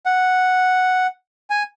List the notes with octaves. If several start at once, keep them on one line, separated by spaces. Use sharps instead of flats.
F#5
G#5